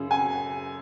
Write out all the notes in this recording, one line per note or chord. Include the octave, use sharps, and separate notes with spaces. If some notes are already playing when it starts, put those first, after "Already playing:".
Already playing: F#2 C#3
G#5